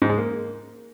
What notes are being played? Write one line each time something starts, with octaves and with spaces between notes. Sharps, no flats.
G#2
G#3
A#3